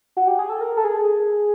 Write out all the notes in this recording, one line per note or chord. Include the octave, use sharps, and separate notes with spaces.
F#4
G4
G#4
A4
A#4
A4
G#4